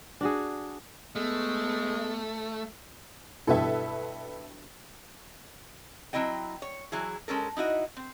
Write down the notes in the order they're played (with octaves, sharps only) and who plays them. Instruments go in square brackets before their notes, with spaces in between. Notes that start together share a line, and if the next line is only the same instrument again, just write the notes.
[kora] D4 F#4 G#4
[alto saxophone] G#3 [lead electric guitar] A3 [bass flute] B3
[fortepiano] G2 B2 E4 [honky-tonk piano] A4 B4 E5
[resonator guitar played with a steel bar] F#3 C4 E4 D#5 G5
C#5
E3 F#3 E4 G#4
G#3 C#4 A4 A#4
D#4 E4 F#4 D#5
C4